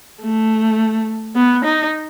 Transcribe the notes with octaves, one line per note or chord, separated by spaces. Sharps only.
A3
B3
D#4